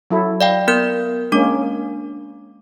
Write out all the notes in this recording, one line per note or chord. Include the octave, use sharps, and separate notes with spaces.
F#3 E4 A4
D5 F5 G5
B3 A#4 G6
G#3 A#3 C#4 D4 D6